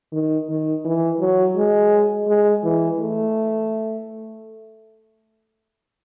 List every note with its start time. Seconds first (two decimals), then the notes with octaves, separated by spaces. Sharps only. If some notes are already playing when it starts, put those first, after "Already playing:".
0.12 D#3
0.49 D#3
0.84 E3
1.20 F#3
1.56 G#3
2.28 G#3
2.64 E3
3.00 A3